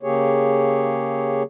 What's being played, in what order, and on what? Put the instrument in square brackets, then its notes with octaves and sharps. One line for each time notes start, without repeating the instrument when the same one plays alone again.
[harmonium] C#3 A#3 G4 G#4 C#5